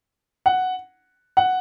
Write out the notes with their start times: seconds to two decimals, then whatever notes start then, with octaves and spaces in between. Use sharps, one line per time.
0.46 F#5
1.37 F#5